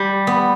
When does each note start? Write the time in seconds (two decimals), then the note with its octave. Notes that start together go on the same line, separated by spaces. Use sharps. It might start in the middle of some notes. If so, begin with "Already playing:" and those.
Already playing: G3
0.27 B3